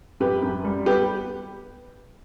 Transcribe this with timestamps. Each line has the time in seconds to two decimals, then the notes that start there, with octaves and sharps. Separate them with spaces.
0.20 F#2 G4 B4
0.42 F#2
0.65 G3
0.86 B3 G4 B4